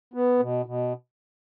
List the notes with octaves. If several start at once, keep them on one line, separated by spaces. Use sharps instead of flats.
B3
B2
B2